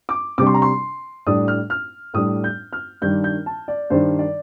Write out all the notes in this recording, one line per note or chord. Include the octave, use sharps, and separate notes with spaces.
D6
C3 G3 D4 D6
C6
A#5
C6
A2 G3 D4 D#6
F6
F6
A2 G3 D4 D#6
G6
F6
G2 D#3 G3 D4 G6
G6
A5
D5
G2 D#3 G3 D4 C5
D5